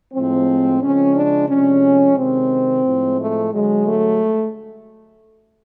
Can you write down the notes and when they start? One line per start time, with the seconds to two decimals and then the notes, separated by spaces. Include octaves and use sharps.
0.13 A2 F3 G#3 C4
0.81 C#3 F3 G#3 C#4
1.15 D4
1.48 C3 F3 G#3 C#4
2.16 C3 D#3 G#3 C4
2.84 A2 F3 G#3
3.18 A3
3.52 D3 F#3 G#3
3.85 A3